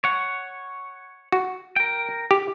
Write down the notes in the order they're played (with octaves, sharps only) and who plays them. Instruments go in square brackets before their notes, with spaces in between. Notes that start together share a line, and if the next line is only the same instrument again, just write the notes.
[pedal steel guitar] C#5 F#5
[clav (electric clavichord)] F#4
[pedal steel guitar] A#4 G5
[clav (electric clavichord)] G4